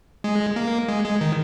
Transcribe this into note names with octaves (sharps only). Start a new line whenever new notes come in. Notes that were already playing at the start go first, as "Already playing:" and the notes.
G#3
A#3
G#3
G#3
D#3